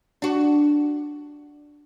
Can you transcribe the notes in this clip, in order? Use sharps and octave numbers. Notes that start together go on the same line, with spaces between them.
D4 F#4